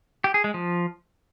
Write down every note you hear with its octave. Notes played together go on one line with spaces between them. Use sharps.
G4
G#4
G#3
F3